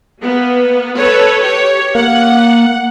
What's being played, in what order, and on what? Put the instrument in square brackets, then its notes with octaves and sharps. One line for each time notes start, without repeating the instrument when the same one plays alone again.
[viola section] A#3 B3
A4 B4 C#5
G4 C#5
[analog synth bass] A#3 [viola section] F#5